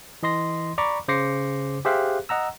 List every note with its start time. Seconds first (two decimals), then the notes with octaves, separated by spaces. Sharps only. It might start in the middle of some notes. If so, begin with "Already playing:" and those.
0.23 E3 D#5 C6 A#6
0.78 D5 A#5 B5 C#6 D6
1.08 C#3 C5 D6 A#6 C7 C#7
1.85 G4 G#4 C5 E5 F5 F#6
2.29 D#5 F#5 A#5 E6